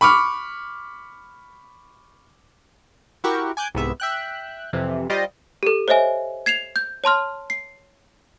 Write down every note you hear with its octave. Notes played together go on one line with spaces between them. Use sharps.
B5 C#6 D6 F6
E4 F#4 G4 A#4 C#6
G#5 D6 F#6 G6
C2 G#2 B3 E5
E5 G5 F#6
F2 C3 E3
G3 F4 C5 D5 D#5
G4 A4
C5 C#5 D#5 E5 G#5
G#6 C7 E7 F7
G6
C#5 A5 C6 F6
C7